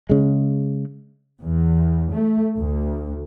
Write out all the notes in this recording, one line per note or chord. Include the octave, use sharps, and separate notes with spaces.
C#3 G#3
E2
A3
D2